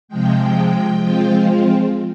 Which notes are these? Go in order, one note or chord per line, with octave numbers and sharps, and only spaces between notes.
C3 F3 G#3 G5
F3 G#3 C4 F4